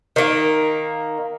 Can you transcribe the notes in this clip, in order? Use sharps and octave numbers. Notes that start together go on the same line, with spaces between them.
D#3 A#3